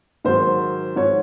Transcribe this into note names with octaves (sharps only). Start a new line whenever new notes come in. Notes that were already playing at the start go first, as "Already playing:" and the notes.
G#2 D#3 F#3 C5
G#2 F3 C#5